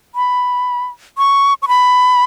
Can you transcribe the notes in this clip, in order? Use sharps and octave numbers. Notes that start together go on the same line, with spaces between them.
B5
C#6
C#6
B5